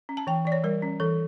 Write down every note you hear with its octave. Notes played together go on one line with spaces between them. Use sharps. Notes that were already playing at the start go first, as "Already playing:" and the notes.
C#4
A5
E3 G5
E3 D5
C#5
G3 A#4
C#4
E3 A4